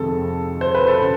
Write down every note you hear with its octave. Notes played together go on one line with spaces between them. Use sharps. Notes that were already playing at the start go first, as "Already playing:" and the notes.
Already playing: F2 C3 D#3 G#3 A4
C5
B4
A4
C#3